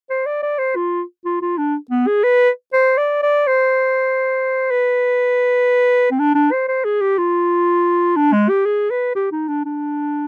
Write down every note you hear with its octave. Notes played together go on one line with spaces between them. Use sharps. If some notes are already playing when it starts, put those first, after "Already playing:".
C5
D5
D5
C5
F4
F4
F4
D4
B3
G#4
B4
C5
D5
D5
C5
B4
C4
D4
D4
C5
C5
G#4
G4
F4
D4
G#3
G4
G#4
B4
G4
D#4
D4
D4